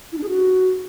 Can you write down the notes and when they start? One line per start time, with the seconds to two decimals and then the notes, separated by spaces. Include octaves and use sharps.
0.12 E4
0.18 D4
0.23 G#4
0.29 F#4